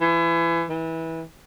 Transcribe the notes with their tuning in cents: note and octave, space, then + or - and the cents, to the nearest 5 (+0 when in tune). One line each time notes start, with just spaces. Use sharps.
E3 +30
E3 -20